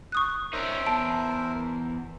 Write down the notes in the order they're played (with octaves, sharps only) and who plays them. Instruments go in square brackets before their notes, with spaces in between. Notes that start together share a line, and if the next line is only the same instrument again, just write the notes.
[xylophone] C#6 D#6 F#6
[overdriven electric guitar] C#4 D#4 [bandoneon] A#4 C5 E5
[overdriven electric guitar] E2 [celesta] A5 [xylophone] D7